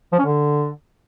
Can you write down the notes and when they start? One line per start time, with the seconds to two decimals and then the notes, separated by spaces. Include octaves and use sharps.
0.13 F3
0.19 C#4
0.25 D3